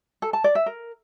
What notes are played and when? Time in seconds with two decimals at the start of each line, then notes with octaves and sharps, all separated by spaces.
0.22 A4
0.33 A5
0.44 D5
0.55 E5
0.66 A#4